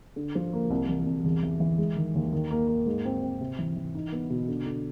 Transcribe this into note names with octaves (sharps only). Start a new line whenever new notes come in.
D3
F3
A#3
C2
E3
C2
E2
E3
E3
G#3
D#3
D#2
D#3
A#3
A#3
G#2
C4
C4
C3
E3
E3
D#4
B3
B2
D3
D3